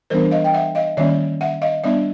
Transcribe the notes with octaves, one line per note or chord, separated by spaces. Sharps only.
E3 G3 B3 D4 A#4 C5
D#5 F5
G5
E5 F#5
D#5 F5
D#3 G3 A#3 C#4 D5 E5
E5 F#5
D#5 F5
G3 B3 D4 D5 E5